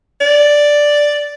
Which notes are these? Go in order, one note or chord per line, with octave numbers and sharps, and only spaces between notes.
D5